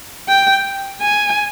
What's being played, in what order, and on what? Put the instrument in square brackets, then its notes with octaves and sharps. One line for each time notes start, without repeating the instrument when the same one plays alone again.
[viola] G5
G#5